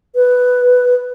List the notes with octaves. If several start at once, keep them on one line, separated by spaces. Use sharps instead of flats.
B4